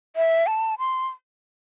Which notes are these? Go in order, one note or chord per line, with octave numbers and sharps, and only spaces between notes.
E5
A5
C6